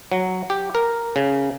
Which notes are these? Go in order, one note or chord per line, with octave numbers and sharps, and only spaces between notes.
F#3
G4
A#4
C#3